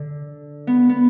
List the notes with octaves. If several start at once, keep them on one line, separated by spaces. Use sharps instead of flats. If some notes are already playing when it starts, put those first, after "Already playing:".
Already playing: D3
B3
B3